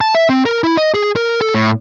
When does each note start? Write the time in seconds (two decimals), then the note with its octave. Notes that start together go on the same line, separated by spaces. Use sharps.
0.01 A5
0.15 E5
0.29 C4
0.45 A#4
0.64 E4
0.77 D#5
0.94 G#4
1.16 A#4
1.41 A4
1.54 A2